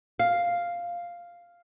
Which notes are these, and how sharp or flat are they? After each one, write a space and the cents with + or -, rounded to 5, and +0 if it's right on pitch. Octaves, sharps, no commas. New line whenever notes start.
F5 +0